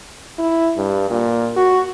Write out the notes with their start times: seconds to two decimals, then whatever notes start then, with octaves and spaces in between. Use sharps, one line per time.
0.39 E4
0.77 G2
1.11 A#2
1.56 F#4